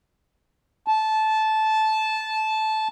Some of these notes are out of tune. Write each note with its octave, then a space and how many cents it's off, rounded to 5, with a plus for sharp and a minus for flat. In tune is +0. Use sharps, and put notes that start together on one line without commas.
A5 -15